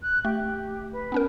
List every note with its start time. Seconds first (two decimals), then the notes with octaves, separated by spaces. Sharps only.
0.02 F#6
0.25 A3 G4
0.92 B4
1.12 B3 C#4 A#4